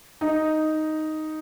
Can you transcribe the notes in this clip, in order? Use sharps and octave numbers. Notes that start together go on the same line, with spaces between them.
D#4